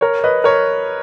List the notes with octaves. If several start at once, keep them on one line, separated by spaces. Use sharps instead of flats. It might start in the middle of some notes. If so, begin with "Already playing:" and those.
A#4 C#5
B4 D#5
A#4 C#5